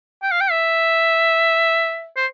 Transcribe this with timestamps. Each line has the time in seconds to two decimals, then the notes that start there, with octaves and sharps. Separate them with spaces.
0.23 G5
0.31 F5
0.41 G5
0.51 E5
2.16 C5